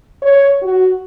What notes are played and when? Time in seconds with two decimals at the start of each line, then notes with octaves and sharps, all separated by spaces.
0.22 C#5
0.62 F#4